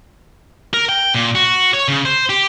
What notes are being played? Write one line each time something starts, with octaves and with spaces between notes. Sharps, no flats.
A#4
G5
A#2
F#4
C#5
C#3
C5
G4